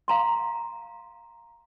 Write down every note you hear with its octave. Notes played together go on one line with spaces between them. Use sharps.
F5 A#5 C6